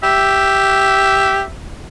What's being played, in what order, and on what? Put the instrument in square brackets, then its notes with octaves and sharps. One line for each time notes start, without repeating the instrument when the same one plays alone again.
[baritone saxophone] G4 [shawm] E5